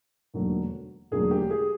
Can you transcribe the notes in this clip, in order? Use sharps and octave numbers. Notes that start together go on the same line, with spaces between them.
E1 D#2 D3 F#3 A3
E1 D#2 D3 F#3 A3 G#4
G4
G#4